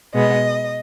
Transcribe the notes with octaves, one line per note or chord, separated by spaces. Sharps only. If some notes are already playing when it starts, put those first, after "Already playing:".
B2 G#3 B3 D#5